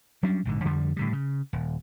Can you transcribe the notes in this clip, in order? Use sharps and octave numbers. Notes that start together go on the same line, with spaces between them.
F#3 G3 C#4 D4
A#1 G#2 D3
F2 D3 F3 G3
A2 D3 G3
C#3
D#1